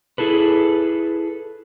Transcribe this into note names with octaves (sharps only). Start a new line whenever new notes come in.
E4 G#4 A4 B4